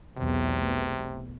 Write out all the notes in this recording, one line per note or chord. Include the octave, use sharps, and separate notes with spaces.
B1 E2 C3 A3